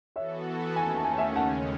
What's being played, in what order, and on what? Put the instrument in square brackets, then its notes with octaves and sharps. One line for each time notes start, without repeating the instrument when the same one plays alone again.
[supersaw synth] E3 B3 F#4 A4 [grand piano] C#5 E5
[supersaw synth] D#2 D#3 A3 C#4 [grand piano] G#5
[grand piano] A5
G#5
A5
G#5
A5
E5 G#5
[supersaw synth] D#2 C#3 G#3 C#4 [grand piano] F#5 A5